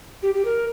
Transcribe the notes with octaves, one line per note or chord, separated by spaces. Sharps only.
G4
G4
A#4